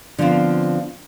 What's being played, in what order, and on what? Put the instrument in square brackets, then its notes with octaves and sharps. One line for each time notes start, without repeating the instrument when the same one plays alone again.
[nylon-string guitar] D3 F3 B3 C4 F4 C5